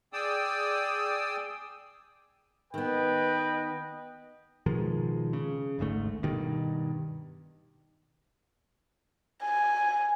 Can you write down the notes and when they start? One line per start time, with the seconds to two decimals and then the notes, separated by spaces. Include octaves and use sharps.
0.13 G#4 D5 G5 D#6 E6
2.74 D#3 B3 B4 D#5 G5
4.66 B2 D#3 F3 G#3
5.33 C#3
5.79 G#1 D2 G#2 A3
6.23 G2 B2 D#3
9.43 G#5